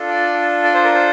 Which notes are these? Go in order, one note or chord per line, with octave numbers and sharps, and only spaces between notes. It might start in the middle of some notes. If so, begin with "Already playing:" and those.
Already playing: D4 F4 A4
D5
D5
C5
A#4
C5